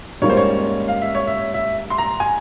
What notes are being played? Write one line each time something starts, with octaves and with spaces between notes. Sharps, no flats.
G#2 G3 A#3 C#4 F4 C#5
C5
C#5
F5
E5
C#5
E5
E5
C6
A#5
G#5